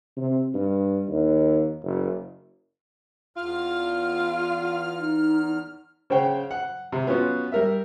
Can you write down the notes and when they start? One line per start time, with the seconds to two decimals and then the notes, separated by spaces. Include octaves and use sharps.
0.17 C3
0.54 G2
1.08 D#2
1.84 F#1
3.37 E2 F4 F6
5.00 D#4
6.10 C#3 C5 C#5 F#5 G5
6.51 F#5
6.92 C3
7.07 B3 C#4 F4 F#4
7.52 G3 A#4 E5